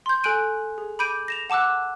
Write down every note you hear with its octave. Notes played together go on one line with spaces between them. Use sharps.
C6 G6
A4 G#5 F#6 D7 D#7
G#4
B5 D6 G6 D7 D#7
A#6 E7 F7
F#5 A5 D6 E6 F#6